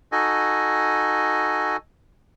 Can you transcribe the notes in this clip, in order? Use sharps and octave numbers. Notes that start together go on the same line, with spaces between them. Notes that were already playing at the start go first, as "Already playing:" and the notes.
D#4 F#4 A4 D#5 G#5